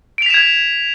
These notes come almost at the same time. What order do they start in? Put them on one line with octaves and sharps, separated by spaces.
D7 F7 B6 E7 G#6